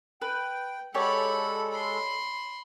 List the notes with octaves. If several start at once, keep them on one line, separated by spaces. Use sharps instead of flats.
B4 G5
G#3 G4 A4 C#5 D5 F#5 B5
B5 C6